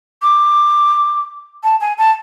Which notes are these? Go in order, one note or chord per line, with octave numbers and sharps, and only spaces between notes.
D6
A5
G#5
A5